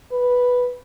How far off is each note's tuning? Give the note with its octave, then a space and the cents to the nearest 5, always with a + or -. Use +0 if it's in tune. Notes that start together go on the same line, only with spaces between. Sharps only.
B4 -5